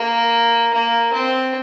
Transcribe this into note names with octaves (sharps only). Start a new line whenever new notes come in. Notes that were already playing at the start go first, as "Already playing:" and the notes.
Already playing: A#3
A#3
C4